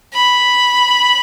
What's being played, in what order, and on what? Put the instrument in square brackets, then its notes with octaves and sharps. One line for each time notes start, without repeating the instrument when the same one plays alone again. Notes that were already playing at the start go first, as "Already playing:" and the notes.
[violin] B5